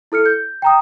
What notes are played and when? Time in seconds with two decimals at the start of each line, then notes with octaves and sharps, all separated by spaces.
0.12 E4 A4 F6 C#7
0.26 G6
0.62 G5 A#5 D#6